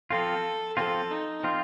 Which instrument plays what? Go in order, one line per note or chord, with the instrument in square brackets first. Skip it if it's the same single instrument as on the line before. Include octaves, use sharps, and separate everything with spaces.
[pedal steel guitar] F3 C4 F4 [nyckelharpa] A4
[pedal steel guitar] F3 C4 F4 [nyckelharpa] A4
[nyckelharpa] D#4
[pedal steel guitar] F3 C4 F4